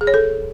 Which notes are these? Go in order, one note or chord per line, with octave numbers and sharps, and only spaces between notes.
G#4
C#5
A4